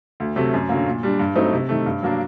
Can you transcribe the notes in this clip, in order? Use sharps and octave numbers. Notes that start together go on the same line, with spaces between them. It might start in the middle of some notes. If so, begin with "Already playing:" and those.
D2
C3 F#3 A3
F#2
D3 F#3 A#3
A#2
G3 D4
G2
F#3 A3 C4 D#4
C3
D#3 A3
G2
F#3 A#3 D4